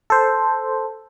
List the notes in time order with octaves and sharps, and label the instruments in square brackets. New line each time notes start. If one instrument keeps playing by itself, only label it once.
[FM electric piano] A4 C5